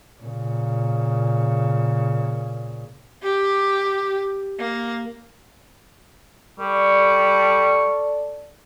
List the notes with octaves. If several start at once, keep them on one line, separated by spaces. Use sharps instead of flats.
A#2 C#3
G4
A#3
G3 A4 D5 C#6